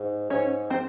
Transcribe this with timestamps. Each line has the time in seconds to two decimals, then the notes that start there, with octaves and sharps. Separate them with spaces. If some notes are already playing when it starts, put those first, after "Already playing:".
Already playing: G#2
0.30 G#2 C#4 C#5
0.70 C4 C5